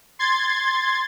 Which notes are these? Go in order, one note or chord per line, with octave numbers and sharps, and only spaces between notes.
C6 G#6 A6